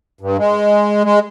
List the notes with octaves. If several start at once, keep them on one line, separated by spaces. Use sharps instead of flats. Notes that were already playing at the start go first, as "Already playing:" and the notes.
G2
G#3
G#3